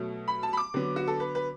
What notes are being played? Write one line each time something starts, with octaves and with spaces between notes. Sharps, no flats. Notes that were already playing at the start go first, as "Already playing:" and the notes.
Already playing: B2 F#3 A3
B5
A5
B5
D6
D3 F#3 B3
F#4
A4
B4
B4